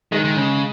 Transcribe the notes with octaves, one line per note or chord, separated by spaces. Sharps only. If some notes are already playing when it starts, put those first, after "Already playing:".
D#3 G#3
D#3
C#3